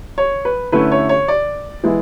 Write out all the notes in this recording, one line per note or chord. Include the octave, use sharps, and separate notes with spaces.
C#5
B4
D3 A3 C#4 E4 B4
C#5
C#5
D5
E3 G#3 B3 E4